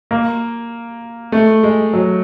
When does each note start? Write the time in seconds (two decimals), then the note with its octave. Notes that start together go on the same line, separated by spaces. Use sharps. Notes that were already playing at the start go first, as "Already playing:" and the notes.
0.11 A#3
1.32 A3
1.63 G#3
1.93 F#3